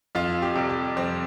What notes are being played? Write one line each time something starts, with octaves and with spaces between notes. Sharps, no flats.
F2 F4
G4
C3 G3
G4
F2 C4